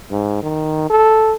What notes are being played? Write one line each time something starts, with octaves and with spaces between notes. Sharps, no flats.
G#2
D#3
A4